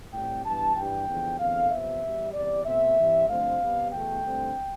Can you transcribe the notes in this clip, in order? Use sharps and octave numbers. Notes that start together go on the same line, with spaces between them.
A2 G3 C4 G5
G2 E3 B3 A5
G2 E3 G3 G5
E2 D3 F3
E2 D3 A3 C4 F5
C3 F3 B3 E5
E2 B2 G3
E2 C3 G3 D5
B2 A3 C4 E5
G2 E3 G3 C4
G2 D3 F3 A3 C4 F5
C3 G3 B3
E2 B2 A3 G5
G2 D3 A3 C4